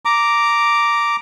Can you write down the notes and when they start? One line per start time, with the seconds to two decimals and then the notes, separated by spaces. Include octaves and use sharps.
0.05 A#5 D6